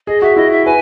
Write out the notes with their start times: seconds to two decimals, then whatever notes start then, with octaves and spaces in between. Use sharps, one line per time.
0.07 G#4 D#5
0.22 F#4 E5
0.36 E4 D#5
0.51 E5
0.65 B4 G#5